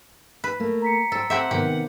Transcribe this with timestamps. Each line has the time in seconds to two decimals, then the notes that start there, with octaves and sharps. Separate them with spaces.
0.44 B4
0.60 A3 A#3
0.82 A#5 B6 C#7
1.12 A4 C5 G5
1.30 C4 G4 A4 E5 F#5
1.51 C3 D#3 B3 G4